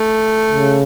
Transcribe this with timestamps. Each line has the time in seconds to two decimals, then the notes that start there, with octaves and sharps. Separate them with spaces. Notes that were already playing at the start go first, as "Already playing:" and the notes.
Already playing: A3
0.52 C#3